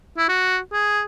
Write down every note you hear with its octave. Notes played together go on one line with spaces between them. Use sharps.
E4
F#4
G#4